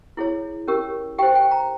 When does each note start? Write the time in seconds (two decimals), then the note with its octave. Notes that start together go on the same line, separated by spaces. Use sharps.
0.17 E4 G#4 C#5
0.68 C#4 G4 A#4
1.18 G4 G5
1.23 C5
1.35 G5
1.51 A#5